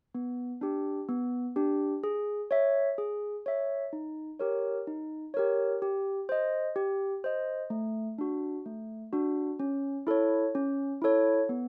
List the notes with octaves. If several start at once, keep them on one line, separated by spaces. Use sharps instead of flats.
B3
D4 G4
B3
D4 G4
G#4
C#5 E5
G#4
C#5 E5
D#4
G4 A#4 C#5
D#4
G4 A#4 C#5
G4
C5 D#5
G4
C5 D#5
A3
D4 F#4
A3
D4 F#4
C#4
E4 A4 C#5
C#4
E4 A4 C#5
B3